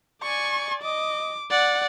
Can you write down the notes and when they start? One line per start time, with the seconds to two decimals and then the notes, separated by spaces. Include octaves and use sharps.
0.22 D5 G#5 C#6
0.82 D#5 D6
1.50 D5 F#5